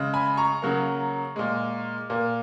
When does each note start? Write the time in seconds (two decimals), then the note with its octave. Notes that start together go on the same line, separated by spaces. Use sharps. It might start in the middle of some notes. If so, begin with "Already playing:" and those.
Already playing: C#3 G#3
0.14 G#5 B5
0.37 A#5 C#6
0.62 C#3 F#3 A#3
1.36 A#2 G#3
2.10 A#2 A#3